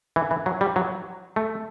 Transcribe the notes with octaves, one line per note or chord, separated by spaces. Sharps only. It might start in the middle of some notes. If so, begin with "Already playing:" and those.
E3
E3
F#3
G3
F#3
A3